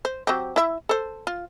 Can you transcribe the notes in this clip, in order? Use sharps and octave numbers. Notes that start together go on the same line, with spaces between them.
C5
F#3 C4 G4
E4 E5
A4 C5
F4